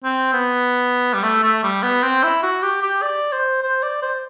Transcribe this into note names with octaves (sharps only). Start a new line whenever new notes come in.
C4
B3
G3
A3
A3
G3
B3
C4
E4
F#4
G4
G4
D5
C5
C5
D5
C5